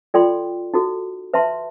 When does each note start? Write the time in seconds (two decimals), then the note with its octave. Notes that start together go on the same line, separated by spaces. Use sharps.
0.14 F4 A4 D5 G5 C6
0.74 D#4 F#4 A4
1.34 B4 E5 A5 C6